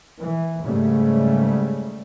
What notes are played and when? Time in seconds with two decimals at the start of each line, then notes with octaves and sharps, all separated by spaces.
0.19 E3
0.64 G#2 C#3 G3 A3